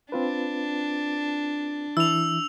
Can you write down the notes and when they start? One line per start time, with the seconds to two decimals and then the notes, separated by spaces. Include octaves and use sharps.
0.12 C4 D4 F4 B4
1.97 E3 E4 E6 F7